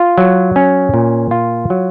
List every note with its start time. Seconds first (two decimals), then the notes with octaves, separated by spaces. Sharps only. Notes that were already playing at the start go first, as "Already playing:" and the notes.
Already playing: F4
0.18 F#3
0.56 C#4
0.94 A#2
1.31 F4
1.70 F#3